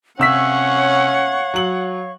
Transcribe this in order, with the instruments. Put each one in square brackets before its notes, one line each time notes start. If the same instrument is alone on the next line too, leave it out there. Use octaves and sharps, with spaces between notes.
[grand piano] C3 E6 B6 [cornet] C#4 [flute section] C#5 F5 C#6 [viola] F#5
[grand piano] F#3 F#7